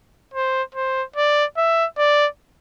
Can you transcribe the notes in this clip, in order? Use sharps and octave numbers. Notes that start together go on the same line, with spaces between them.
C5
C5
D5
E5
D5